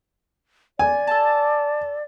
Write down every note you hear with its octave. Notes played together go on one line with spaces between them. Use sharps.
D5 G#5
A4 A5